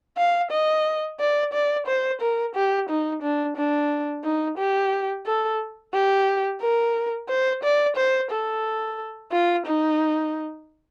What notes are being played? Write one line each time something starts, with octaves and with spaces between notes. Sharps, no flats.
F5
D#5
D5
D5
C5
A#4
G4
D#4
D4
D4
D#4
G4
A4
G4
A#4
C5
D5
C5
A4
F4
D#4